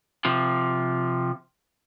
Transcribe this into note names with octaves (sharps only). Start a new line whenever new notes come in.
C3 F3